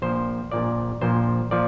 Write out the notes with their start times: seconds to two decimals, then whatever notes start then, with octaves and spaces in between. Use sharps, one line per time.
0.02 A#1 A#2 F3 C5
0.51 A#1 A#2 F3 D5
1.01 A#1 A#2 F3 C5
1.51 A#2 F3 D5